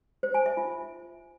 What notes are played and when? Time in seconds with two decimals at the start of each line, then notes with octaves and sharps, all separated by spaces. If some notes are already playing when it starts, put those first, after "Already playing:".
0.23 C5
0.34 G#5
0.46 E5
0.57 F4